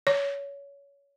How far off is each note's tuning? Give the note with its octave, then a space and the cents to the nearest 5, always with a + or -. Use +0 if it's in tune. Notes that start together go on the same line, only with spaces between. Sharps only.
C#5 +20